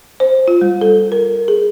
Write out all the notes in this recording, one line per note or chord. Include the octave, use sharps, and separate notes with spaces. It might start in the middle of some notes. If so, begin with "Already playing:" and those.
C5
F4
G3
A4
A#4
G#4